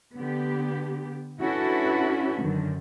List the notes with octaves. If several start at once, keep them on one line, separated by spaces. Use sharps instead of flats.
D3 B3 G4
C#4 D4 E4 F#4 A4 B4
F#2 D3 D#3